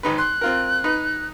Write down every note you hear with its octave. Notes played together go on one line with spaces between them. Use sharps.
G#1 D#4 B4
C6 F#6
C4 F4 A#4
D#4 B4